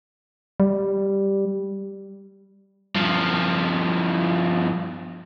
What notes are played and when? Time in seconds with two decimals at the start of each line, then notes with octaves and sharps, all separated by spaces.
0.60 G3
2.95 G2 F3